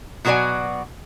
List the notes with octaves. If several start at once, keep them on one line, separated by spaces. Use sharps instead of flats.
B2 F#3 F#4 C5 D5 G#5